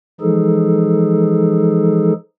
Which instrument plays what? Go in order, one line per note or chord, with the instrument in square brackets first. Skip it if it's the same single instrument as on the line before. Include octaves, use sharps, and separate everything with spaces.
[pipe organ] E3 F3 G#3 D#4 G#4 A4